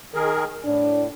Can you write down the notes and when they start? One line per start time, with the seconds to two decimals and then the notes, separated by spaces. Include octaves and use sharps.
0.14 D#3 G#4 A#4
0.65 A2 D4